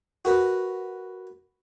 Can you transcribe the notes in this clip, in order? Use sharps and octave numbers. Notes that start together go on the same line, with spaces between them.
F#4 A#4 B4